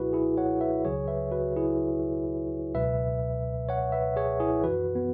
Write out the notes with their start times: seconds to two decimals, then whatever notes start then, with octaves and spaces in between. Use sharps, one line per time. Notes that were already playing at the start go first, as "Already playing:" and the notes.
Already playing: C#2 B2 F#3 E4 F#4 G#4 B4
0.13 E4 G#4
0.37 C#5 F#5
0.61 B4 E5
0.85 C#2 C#3 F#3 G#4 C#5
1.08 B4 E5
1.31 F#4 B4
1.56 E4 G#4
2.74 C#2 B2 F#3 B4 E5
3.69 C#5 F#5
3.92 B4 E5
4.16 G#4 C#5
4.40 E4 G#4
4.64 F#2 E3 F#4 B4
4.95 B3